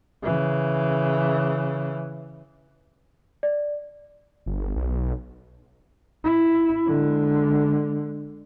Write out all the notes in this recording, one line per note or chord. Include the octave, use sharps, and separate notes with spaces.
C#3 E3
D5
G1
B1
E4
D3 G#3